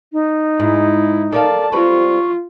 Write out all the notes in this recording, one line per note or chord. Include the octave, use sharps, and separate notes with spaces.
D#4
G#2 E4
A4 A#4 D5 F5 A5
G3 C4 F4 B4 C#6